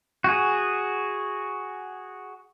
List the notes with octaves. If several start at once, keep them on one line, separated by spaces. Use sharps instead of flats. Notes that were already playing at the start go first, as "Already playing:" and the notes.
F#4 G#4